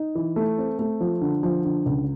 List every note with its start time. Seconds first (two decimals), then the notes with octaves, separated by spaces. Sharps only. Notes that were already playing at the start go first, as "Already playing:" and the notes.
Already playing: D#4
0.15 E3
0.36 A3
0.58 C4
0.79 A3
1.01 F3
1.21 D3
1.43 F3
1.64 D3
1.86 C#2